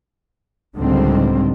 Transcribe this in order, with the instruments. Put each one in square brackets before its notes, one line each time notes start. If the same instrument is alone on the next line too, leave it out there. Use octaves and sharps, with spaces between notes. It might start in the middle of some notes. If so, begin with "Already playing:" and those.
[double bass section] C#2 A2 D3 D#3 G3 C4